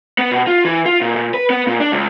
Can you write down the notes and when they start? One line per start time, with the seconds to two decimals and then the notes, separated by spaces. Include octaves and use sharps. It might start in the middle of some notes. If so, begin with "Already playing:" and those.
0.19 B3
0.32 B2
0.47 F4
0.65 E3
0.86 F4
1.01 A#2
1.16 A#2
1.34 B4
1.50 B3
1.67 A#2
1.80 D4
1.92 C#2